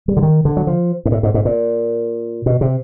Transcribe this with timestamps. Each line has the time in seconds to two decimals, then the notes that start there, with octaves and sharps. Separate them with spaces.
0.08 G3
0.17 D3
0.23 D#3
0.45 D3
0.57 F#3
0.67 F3
1.05 G#2
1.12 A2
1.23 G#2
1.34 G#2
1.45 A#2
2.46 B2
2.61 C3